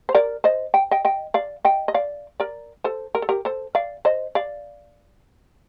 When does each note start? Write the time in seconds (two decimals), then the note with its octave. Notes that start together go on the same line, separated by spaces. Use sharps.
0.09 C5
0.15 A#4 D5
0.44 C5 D#5
0.74 G5
0.91 D#5 G5
1.05 D#5 G5
1.34 D5 F5
1.65 D#5 G5
1.88 D#5
1.94 D5 F5
2.40 A#4 D5
2.84 A4 C5
3.15 A#4
3.22 A4
3.29 G4 A#4
3.45 A4 C5
3.75 D5 F5
4.05 C5 D#5
4.35 D5 F5